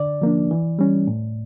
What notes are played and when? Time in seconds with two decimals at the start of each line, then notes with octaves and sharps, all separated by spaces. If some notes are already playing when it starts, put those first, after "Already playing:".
Already playing: D3 D5
0.22 F3 A#3 D4
0.51 E3
0.79 G3 C#4
1.07 A2